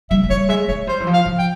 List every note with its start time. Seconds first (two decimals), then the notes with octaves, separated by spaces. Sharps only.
0.10 G3 E5
0.23 G#3
0.30 G3 C#5
0.49 G#3 E5
0.68 G#3 C#5
0.87 G3 C5
1.00 E3
1.07 F3
1.13 F5
1.25 F3
1.38 G5